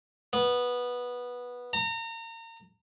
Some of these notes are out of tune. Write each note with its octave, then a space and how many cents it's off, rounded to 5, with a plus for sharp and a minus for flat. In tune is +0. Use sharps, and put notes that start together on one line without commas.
B3 -10
A#5 -35